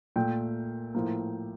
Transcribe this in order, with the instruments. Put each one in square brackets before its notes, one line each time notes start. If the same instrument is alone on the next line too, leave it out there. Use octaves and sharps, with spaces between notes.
[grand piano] A#2 A3 G5
A2 F3 A#3